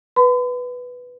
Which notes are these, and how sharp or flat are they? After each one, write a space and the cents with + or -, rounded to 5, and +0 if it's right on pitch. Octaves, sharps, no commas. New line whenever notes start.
B4 +0 B5 +45